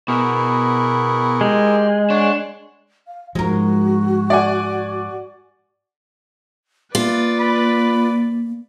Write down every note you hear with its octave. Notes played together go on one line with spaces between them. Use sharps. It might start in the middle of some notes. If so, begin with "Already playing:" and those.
B2 B3 E4 G#4 A#4 C#6
G#3 G4 C6
D4 C#5 F#5 C6
F5
G#2 F3 G#3 F#4 A#4
D5 F#5 G#5
A#3 F4 B4 D5
B5